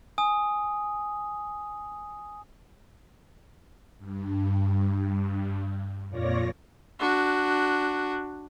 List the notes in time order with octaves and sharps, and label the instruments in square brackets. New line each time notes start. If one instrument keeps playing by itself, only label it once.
[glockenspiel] G#5 D#6
[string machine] G2
F2 A#2 F4 C#5 D5 A#6
[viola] D4 F#4